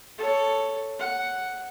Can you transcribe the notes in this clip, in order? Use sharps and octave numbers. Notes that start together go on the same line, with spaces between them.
A4 C#5
F#5